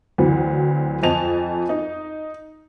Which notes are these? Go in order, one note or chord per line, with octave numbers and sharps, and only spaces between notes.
D2 E3 F#3 C4
F2 C4 D#5 G#5 A5 F7
D#4